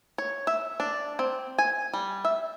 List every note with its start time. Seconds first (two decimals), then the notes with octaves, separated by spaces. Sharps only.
0.18 C#5
0.47 E5
0.80 D4
1.19 C4
1.58 G#5
1.93 G3
2.25 E5